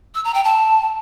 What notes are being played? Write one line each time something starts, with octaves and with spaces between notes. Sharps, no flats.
E6
A#5
G5
A5